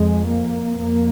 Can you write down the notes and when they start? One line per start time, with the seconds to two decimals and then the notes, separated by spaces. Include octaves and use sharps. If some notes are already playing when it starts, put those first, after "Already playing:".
Already playing: F2 G#3
0.26 A#3
0.78 F2 A#3